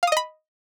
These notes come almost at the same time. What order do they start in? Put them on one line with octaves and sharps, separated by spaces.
F5 D#6 D#5 B5